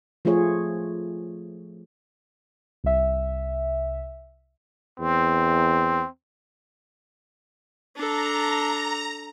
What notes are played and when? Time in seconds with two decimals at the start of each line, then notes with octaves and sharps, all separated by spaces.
0.25 F3 A3 F4 G#4 C#5
2.84 C2 E5
5.00 E2 C4
7.96 D4 A4 A#5